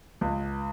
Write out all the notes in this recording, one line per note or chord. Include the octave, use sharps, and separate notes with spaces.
C#2